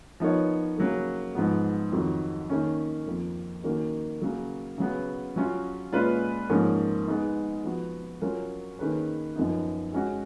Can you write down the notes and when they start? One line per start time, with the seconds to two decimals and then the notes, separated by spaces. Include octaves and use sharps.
0.20 F3 B3 D#4 A#4 C#5
0.78 C#3 F#3 A#3
1.35 G#2 F3 B3
1.92 F2 D#3 F#3
2.50 D#3 A#3 C#4
3.07 F2 F3 A#3
3.63 D#3 A#3 C#4 F#4 A#4
4.22 C#3 F#3 A#3
4.78 C#3 F#3 B3
5.36 F#3 C#4 F4
5.92 A#2 G#3 C#4 F4 B4
6.50 G#2 F3 A#3 C#4
7.07 G#3 B3 D#4
7.64 F3 B3 F#4
8.22 F#3 C#4 F4 A#4 C#5
8.79 D#3 A#3 C#4 G#4 B4
9.36 F#2 F3 B3 D#4
9.93 G#3 C#4 F#4